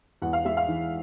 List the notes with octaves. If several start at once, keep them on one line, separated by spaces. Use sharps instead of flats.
E2 F#5
F5
G#3 E5
F5
E3